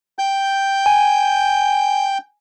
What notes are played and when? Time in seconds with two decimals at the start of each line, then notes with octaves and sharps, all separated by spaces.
0.19 G5 G6
0.86 G#5